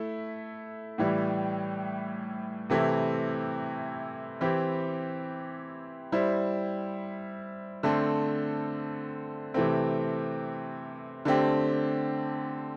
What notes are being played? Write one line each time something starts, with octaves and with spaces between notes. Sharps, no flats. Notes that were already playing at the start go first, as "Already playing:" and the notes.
Already playing: A3 E4
A2 E3 G3 E4
C3 E3 A3 C4 E4
E3 C4 E4 G4
G3 E4 C5
D3 A3 C4 A4 C5
C3 E3 A3 C4
D3 A3 C4 G4